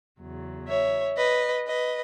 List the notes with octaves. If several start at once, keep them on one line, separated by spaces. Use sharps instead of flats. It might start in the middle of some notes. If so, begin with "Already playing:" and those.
E2 C#3 F#3
C#5 E5
B4 D#5
B4 D#5